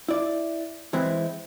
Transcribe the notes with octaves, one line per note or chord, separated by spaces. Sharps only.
E4 D5
E3 G#3 C4 E4